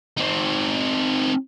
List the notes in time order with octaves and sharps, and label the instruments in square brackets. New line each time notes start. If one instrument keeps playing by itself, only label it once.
[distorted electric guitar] C4 D#4